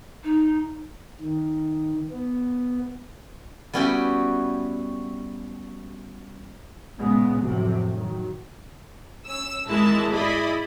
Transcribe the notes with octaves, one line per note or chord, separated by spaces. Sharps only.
D#4
D#3
B3
G3 B3 C#4 E4 F#4 G5
A#2 C#3 G#3 B3
F1 A2 C3 F#3
D#3 F#3
C#4 E6
G#1 E3 G#3 E4 A#4 A5
E4 G#4 D5 D#5 B5